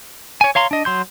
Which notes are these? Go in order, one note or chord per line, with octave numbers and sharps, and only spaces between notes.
C#5 G#5
C#5 F5 A#5 C6
D4 D#5
F#3 C6 G6